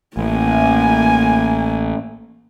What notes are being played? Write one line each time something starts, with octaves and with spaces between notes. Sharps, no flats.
A1 A#3 G#5